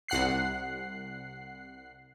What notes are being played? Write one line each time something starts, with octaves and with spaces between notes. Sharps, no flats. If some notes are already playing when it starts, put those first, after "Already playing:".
C2 F#5 F#6 C7